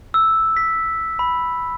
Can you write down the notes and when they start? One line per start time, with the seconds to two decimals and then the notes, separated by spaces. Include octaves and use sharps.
0.14 E6
0.57 B6
1.19 B5